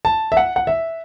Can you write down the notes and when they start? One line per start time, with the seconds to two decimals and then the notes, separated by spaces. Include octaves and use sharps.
0.05 A5
0.32 E5
0.37 F#5
0.56 F#5
0.67 E5